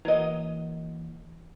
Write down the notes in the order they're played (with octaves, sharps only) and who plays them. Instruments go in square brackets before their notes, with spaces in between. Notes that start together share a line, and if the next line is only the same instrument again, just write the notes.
[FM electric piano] E3 A#3 [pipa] F#3 D#5